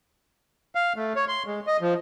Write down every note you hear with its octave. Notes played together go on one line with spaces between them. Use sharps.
F5
A3
C#5
C6
G#3
D#5
F3